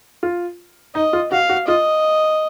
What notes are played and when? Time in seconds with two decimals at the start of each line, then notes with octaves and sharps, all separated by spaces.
0.23 F4
0.95 D#4 D#5
1.13 F4
1.31 F#4 F5
1.49 F#4
1.67 F4 D#5